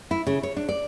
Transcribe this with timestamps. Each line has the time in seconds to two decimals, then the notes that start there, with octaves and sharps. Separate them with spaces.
0.11 E4
0.27 C#3
0.43 C#5
0.56 D4
0.69 D5